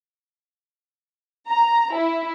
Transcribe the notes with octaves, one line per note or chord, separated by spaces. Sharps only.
A#5
E4